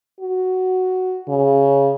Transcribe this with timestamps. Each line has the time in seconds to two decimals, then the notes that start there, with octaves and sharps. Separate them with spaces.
0.21 F#4
1.28 C#3